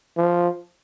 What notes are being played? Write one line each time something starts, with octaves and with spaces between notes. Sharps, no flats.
F3